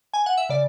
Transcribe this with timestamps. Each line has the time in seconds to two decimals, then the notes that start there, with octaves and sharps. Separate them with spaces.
0.14 G#5
0.26 F#5
0.38 E5
0.49 C#3 D5